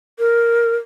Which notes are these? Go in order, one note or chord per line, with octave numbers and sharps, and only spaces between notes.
A#4